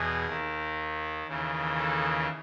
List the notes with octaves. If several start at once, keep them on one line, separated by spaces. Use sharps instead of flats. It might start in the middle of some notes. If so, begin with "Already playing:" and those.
Already playing: E2 B2 G#4
D#2 D#3
D#2 C#3 E3
A4